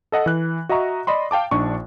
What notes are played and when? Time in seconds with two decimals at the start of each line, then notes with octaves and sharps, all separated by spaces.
0.12 A4 D#5 F#5 A5
0.26 E3 F#6
0.69 F#4 D#5 E5 A#5 C#6
1.07 D5 D#5 B5 C6
1.31 F5 G5 A5 D6
1.51 A#1 D4 D#4 C#6